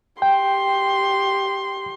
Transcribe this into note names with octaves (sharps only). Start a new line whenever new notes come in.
G4 G5 C6